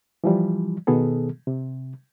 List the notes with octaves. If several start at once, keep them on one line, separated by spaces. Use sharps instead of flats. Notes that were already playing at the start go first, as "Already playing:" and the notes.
E3 F3 G3
B2 D#3 B3 G#4 A4
C3